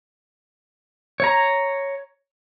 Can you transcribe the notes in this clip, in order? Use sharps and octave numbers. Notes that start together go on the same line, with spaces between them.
C#5 A#5